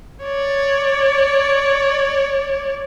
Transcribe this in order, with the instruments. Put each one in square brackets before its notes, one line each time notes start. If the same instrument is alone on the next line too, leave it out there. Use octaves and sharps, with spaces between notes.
[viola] C#5 D5